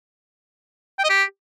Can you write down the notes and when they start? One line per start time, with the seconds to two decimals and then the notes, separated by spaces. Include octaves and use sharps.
0.99 G5
1.04 D#5
1.10 G4